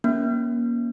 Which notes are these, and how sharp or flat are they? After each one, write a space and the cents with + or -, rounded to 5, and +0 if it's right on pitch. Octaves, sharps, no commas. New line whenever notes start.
A#3 +30 C#4 +15